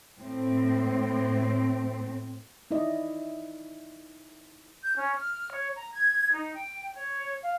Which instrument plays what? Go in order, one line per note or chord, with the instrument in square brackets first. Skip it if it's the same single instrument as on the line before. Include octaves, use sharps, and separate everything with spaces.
[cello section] A2 C4
[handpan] D#4 E4 D5 D#5
[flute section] G6
C#4
F6
C#5
A#5
G#6
D#4
G5
C#5
F5